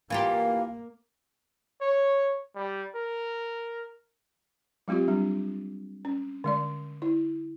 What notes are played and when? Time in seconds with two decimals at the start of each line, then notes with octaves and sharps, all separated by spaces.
0.10 E3 A#3 F4 G4 F5
1.81 C#5
2.56 G3
2.96 A#4
4.88 F#3 G#3 C4 F4 G4
5.08 G3 D4
6.05 C#4
6.44 D3 G#3 D5
7.02 E4